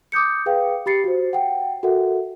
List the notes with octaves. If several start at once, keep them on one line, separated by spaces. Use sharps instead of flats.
D6 D#6 G6 C#7
G#4 B4 F5 G5
G4 B5 A6 C7 C#7
F#4 C5
F#5 G5
F#4 A4 A#4 E5 F#5